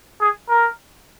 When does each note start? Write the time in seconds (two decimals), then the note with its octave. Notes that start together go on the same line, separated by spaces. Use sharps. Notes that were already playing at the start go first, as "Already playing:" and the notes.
0.20 G#4
0.49 A#4